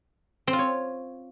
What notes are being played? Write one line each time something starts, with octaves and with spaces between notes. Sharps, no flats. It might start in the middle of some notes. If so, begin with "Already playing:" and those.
C4
F4
C#5